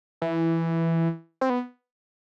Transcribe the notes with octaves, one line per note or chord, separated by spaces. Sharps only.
E3
C4
B3